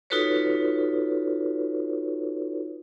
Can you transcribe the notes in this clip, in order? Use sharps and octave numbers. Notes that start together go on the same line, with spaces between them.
D#4 F4 F#4 A4 B4 C#5